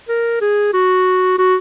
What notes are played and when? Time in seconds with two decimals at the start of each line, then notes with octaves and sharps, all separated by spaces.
0.08 A#4
0.41 G#4
0.73 F#4
1.39 F#4